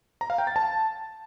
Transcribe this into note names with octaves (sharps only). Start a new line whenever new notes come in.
A#5
F5
G5
A6
A5